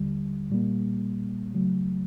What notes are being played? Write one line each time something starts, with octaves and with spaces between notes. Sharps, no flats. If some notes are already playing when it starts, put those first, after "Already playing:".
Already playing: D#2 D3 G3
A#2 G3 A#3
C#3 F#3 A3